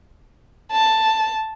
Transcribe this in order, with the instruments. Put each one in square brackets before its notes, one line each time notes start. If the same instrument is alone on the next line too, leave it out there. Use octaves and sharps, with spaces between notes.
[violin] A5